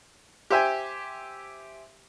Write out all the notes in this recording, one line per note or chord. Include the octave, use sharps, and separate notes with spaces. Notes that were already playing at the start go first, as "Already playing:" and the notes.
G4 C5 E5 G5 G#5